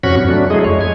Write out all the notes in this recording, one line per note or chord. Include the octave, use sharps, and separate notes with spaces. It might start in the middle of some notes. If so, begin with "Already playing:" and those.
F2 C3 C#4 F#4 B5 C#6
G2
F#3 A3 D4
G#3 A3 E4 G#4 D#5
F2 G#3 C#5
G#5